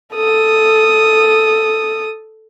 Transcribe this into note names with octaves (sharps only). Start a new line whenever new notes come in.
A4 D#6